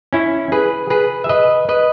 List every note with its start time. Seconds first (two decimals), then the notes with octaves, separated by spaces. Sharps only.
0.13 C#4 E4
0.52 G#4 B4
0.90 G#4 B4
1.24 E5
1.29 B4 D#5
1.69 B4 D#5